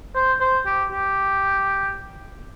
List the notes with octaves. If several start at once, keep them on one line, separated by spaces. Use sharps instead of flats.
C5
C5
G4
G4